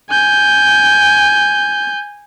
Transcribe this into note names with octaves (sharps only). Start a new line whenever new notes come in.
G#5 G6